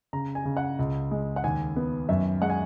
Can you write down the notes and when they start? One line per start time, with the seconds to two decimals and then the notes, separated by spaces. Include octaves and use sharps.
0.13 C#3 A#5
0.35 G#5
0.45 C#3
0.57 F#5
0.79 C#2
1.11 G#3
1.36 F#5
1.44 D#2 G#5
1.76 B3
2.09 F#2 E5
2.41 G#3 F#5
2.50 G#5